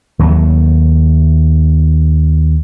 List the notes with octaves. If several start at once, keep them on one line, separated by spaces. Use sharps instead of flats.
D#2 F#3 A3